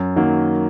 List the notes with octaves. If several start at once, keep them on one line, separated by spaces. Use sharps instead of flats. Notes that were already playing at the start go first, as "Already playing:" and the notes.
Already playing: F#2
D#3 F#3 A#3